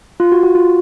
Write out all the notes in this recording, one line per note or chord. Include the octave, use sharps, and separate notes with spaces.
F4
F#4
F#4
F4